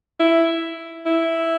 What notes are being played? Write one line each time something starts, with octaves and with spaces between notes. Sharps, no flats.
E4
E4